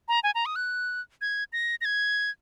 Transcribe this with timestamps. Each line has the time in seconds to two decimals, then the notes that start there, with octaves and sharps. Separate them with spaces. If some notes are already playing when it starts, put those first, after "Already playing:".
0.08 A#5
0.23 G#5
0.35 A#5
0.46 D#6
0.56 F#6
1.21 G#6
1.53 A#6
1.81 A#6
1.85 G#6